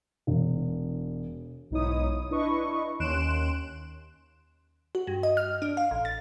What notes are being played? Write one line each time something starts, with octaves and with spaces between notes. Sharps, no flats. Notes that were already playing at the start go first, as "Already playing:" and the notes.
E1
B1 G#2 D#4 E4 C#5 D#6
D4 E4 B4 D#5 C#6
D#2 C#4 C6 F#6 D7 E7
F#4
G2
D#5
F6
D4
F5
A1
A6